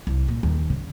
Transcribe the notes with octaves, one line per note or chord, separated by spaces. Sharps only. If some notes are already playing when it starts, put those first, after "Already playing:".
C2
A#2
D#2
C#3